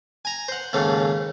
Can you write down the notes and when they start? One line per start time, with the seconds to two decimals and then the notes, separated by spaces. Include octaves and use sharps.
0.25 G#5 A#5
0.48 C5 F#5
0.73 D#2 G#2 C#3 A3